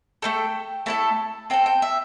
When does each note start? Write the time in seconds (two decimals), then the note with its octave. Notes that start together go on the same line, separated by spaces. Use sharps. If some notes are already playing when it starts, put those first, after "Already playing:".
0.22 A3 C4 A4 G5
0.86 A3 E4 A4 A5
1.50 C4 A4 G5
1.66 G5
1.82 E5